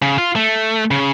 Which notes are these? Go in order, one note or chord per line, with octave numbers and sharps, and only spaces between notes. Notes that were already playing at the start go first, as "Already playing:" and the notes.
C#3
F4
A3
C#3